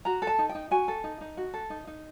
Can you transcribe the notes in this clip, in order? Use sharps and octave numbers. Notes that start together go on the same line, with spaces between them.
F#4 A#5
A4
A5
D#4
G5
D#4
F#4 G#5
A4
D#4
D#4
F#4
A4
D#4
D#4